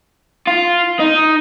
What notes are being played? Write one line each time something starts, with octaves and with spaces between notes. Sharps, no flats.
F4
D#4